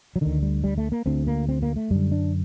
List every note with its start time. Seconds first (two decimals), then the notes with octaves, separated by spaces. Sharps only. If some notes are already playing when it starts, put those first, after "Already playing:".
0.16 F#3
0.21 D2 D3 D#3
0.42 G3
0.64 G3
0.78 A3
0.92 A#3
1.06 D2 D3 C4
1.27 A#3
1.49 C4
1.63 A#3
1.76 A3
1.91 F#2 D3 G3
2.12 D4